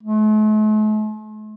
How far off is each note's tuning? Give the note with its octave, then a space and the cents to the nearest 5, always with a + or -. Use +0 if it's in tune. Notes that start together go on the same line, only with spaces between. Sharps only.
A3 -45